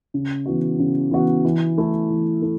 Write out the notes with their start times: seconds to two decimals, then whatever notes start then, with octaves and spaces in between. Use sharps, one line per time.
0.14 C#3
0.46 E3 B3 F#4
0.79 C#3
1.11 E3 B3 F#4
1.45 E3
1.78 A3 E4 A4
2.10 E3
2.42 A3 E4